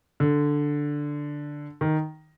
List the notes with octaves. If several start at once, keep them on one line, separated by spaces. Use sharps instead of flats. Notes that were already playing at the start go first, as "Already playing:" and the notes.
D3
D#3